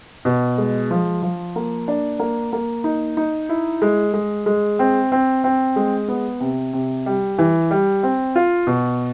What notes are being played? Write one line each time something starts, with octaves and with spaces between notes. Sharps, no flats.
B2
G#3
F3
F3
A#3
D4
A#3
A#3
D#4
D#4
E4
G#3
G#3
G#3
C4
C4
C4
G#3
B3
C3
C3
G3
E3
G3
C4
F4
B2